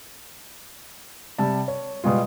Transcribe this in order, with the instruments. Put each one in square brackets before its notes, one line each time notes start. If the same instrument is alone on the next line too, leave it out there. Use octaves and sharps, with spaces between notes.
[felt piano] C3 G3 A5
C#5
B2 G3 G#3 F4